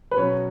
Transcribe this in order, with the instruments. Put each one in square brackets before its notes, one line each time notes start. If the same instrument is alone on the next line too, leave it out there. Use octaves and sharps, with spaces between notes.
[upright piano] B4
[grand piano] B2 F#3 C#4 [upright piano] C#5